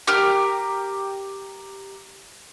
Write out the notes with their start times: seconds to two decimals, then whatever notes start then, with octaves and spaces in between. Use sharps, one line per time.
0.07 G4 A#4 F6